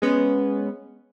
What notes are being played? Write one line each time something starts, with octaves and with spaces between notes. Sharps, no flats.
G#3 B3 C#4